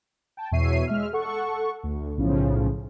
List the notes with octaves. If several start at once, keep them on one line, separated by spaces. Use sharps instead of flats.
G5 A5
E2 B2 C#5 E5 C7 D#7
G#3 E5 F6
A4 F#5 C#6
D2
B1 A2 C#3 F3